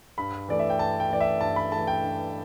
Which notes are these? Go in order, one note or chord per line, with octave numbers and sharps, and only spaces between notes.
G2 B5
E3 A3 D5
E5
G5
G2 A5
G5
E3 A3 D5
E5
G2 A5
B5
E3 A3 A5
G5
G2